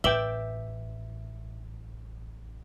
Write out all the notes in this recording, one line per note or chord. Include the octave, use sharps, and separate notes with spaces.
A1 B4 E5 G5 D6 E6 F#7 G7